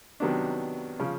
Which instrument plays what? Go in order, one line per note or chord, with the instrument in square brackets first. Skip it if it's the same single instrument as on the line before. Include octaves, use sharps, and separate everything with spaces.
[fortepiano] C3 D#3 F#3 B3 D4
C#3 F3